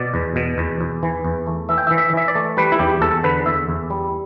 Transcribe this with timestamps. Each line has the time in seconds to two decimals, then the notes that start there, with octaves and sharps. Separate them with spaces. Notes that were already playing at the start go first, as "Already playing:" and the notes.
Already playing: B2 D5
0.14 E2
0.36 B2
0.58 E2
0.81 E2
1.03 E3
1.24 E2
1.47 A3
1.69 E3 E5
1.78 G5
1.87 E5
1.91 E3
1.98 E5
2.13 E3 E5
2.28 D5
2.35 A3
2.57 G3 B4
2.72 E4
2.79 E2 G4
3.02 E2 A4
3.23 D3 B4
3.46 E2 E5
3.69 E2
3.90 G3